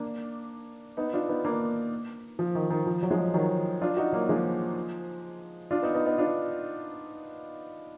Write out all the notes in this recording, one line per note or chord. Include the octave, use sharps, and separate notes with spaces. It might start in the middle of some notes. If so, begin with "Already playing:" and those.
Already playing: A#3 D4
B3 D#4
D4 F4
B3 D#4
A#3 D4
F3
D#3
D#3
F3
F#3
F3 G#3
D#3 F#3
D4 F4
D#4 F#4
F#3 A#3
F3 G#3
D4 F4
B3 D#4
B3 D#4
B3 D#4
D4 F4